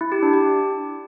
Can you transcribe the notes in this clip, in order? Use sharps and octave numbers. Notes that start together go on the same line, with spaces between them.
E4
G4
D4
G4